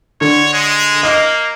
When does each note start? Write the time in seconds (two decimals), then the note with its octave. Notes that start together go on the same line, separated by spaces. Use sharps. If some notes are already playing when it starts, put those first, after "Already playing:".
0.21 D3 C#5
0.54 G#3
1.03 A#3 D#5